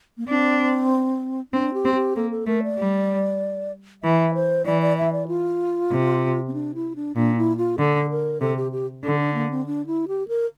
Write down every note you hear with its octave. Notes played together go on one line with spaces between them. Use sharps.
A#3
C4 D4
C4 D4
G4
C4
G4
A#3 A4
A4
A3 A#4
D5
G3
E3 E5
C5
E3 D5
D5
E5
D5
F4
C3
C4
D4
E4
D4
A#2 D4
E4
F4
D3 A4
A#4
C3 A4
G4
G4
D3 A4
D4
A#3
C4
D4
E4
G4
A#4